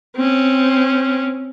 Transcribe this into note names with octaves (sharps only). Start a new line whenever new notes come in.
C4 C#4